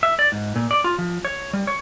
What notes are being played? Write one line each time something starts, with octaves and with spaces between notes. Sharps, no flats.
E5
D5
G#2
A#2
D5
F4
F3
C#5
G3
C#5